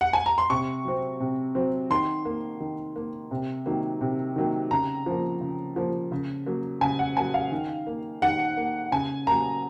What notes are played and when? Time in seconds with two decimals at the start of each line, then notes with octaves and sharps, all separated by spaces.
0.01 F#5
0.13 G#5
0.26 A#5
0.38 C6
0.50 C3 C#6
0.85 F#3 C4
1.20 C3
1.55 F#3 C4
1.90 D#3 C6
2.25 A#3
2.60 D#3
2.96 A#3
3.31 C3
3.66 D#3 F#3 A#3
4.01 C3
4.36 D#3 F#3 A#3
4.71 C#3 A#5
5.06 F3 A#3
5.41 C#3
5.76 F3 A#3
6.12 C#3
6.46 F#3 A#3
6.81 C#3 G#5
6.99 F#5
7.17 A#3 G#5
7.19 F#3
7.34 F5
7.52 D#3
7.87 A#3
8.22 D#3 F#5
8.57 A#3
8.92 C#3 G#5
9.27 F#3 A#3 A#5